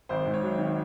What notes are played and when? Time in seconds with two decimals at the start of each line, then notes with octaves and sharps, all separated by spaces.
0.09 G#1 C5
0.26 G#2
0.34 C#5
0.43 F#3
0.59 D#3